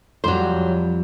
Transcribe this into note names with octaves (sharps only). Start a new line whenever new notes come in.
F2 F#3 G3 C5